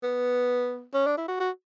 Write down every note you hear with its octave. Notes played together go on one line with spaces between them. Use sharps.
B3
C#4
D4
E4
F#4
F#4